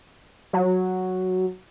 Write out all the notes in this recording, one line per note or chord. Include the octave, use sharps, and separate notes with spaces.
F#3